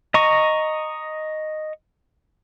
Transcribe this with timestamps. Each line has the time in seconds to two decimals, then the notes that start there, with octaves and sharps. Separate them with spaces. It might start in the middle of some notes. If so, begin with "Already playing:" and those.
0.14 D#5 A#5 C#6